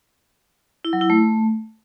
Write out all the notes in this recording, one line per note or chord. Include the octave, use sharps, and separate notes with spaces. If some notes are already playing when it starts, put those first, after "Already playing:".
E4
F#3
E4
A3